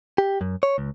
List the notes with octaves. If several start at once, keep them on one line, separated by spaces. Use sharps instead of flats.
G4
F#2
C#5
C#2